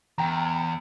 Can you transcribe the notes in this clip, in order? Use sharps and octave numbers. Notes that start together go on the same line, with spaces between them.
E2 G5 A#5